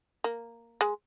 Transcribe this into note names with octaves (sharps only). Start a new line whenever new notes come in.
A#3
G#3